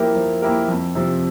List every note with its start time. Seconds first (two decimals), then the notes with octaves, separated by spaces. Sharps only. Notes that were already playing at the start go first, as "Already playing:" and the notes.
Already playing: F3 A#3 E4 G4 A#4
0.15 F3
0.42 A#3 E4 G4 A#4
0.68 F2
0.95 C3 F3